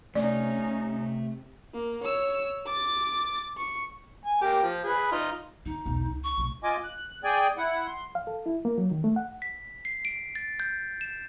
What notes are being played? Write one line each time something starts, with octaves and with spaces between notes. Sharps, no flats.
C3 A3 C#4 D#4 D5
A#3
C#5 E6
D6 A6
C#6
G#5
A#3 G4
F3
G#4 B4
D#4 F4
D3 D#4
B1 E2
C#2
C#6
B1 A2
F4 D#5 G#5 D6
F#6
G#4 D5 G5 G#5
E4 F#5
C6
F5
A4
E4
A#3
F#3
D#3
A3
F#5
B6
C7
D7
A6
G6
E7